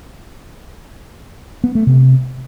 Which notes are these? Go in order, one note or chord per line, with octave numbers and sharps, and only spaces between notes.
B3
A3
C3